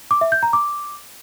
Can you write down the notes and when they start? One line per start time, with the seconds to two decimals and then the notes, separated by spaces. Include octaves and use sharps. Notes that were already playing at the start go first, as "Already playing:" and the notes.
0.11 D6
0.21 E5
0.32 G6
0.43 A#5
0.53 D6